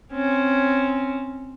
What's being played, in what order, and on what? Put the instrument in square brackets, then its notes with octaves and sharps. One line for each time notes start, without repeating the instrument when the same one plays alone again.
[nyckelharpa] C4 C#4